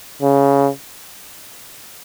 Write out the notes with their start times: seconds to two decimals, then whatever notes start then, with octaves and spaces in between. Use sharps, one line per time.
0.22 C#3